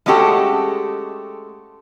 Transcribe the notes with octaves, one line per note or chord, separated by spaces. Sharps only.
G#3 A3 C#4 F#4 G4 A4